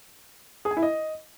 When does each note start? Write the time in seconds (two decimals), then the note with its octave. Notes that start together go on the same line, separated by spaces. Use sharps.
0.65 G#4
0.71 G#5
0.77 E4
0.82 D#5